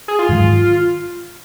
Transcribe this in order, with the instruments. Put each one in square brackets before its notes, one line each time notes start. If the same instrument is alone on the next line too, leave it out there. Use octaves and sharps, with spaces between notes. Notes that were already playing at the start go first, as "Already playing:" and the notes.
[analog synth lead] G#4
F4
[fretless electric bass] G#2 D#3 F#3